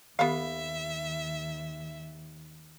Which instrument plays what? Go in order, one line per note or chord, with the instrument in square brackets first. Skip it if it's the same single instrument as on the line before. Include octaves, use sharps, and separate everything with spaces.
[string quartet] D#2 [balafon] D#3 G4 [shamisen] B3 F5 [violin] E5